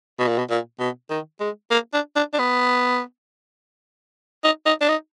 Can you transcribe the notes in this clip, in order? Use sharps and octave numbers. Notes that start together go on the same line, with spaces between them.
B2
A#2
B2
A#2
B2
D#3
G#3
A#3
D4
D4
D4
B3
D#4
D#4
D4
D#4